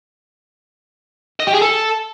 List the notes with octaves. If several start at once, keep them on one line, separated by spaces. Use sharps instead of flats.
D#5
G4
G#4
A4